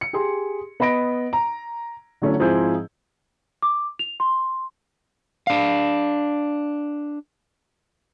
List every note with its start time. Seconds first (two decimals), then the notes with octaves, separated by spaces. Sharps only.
0.01 C#7
0.13 G4 G#4 C6
0.80 B3 D#5 B5 A#6 D7
1.33 A#5
2.22 D3 F#3 A3 C#4 E4
2.39 G#2 F3 C4 E4 G#4 G6
3.62 D6
3.99 F7
4.20 C6
5.47 D4 F5